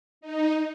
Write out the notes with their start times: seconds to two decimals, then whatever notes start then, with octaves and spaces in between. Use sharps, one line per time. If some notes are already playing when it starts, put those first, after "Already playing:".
0.21 D#4